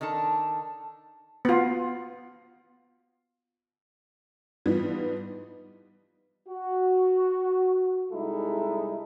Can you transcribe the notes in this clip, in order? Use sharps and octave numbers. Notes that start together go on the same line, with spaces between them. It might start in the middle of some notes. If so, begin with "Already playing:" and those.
D#3 D4 A4 A5
B3 F4
G#2 E3 F3 G3 B3
F#4
C2 G3 G#3 D#4 E4 A4